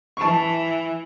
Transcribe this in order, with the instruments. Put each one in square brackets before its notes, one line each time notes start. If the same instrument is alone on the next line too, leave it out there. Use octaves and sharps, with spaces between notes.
[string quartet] E3 [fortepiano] A5 C#6